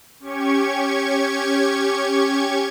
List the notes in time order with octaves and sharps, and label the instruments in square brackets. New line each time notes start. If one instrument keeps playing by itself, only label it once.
[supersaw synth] C#4 G4 C#6 G#6